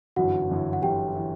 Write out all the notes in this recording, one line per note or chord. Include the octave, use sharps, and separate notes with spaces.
G1 F#2 E3 F#4 F#5
G1 F#2 E3
F#5
G1 F#2 E3 G4 G5
E3